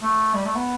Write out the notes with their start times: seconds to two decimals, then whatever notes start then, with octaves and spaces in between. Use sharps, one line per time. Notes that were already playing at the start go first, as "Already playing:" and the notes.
0.03 A3
0.34 G3
0.46 A3
0.56 B3